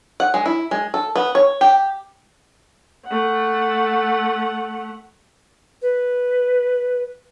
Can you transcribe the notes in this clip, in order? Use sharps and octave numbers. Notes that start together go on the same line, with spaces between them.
F#5
G#3
E4
G#3
A4
B3
C#5
G4
A3 F#5
B4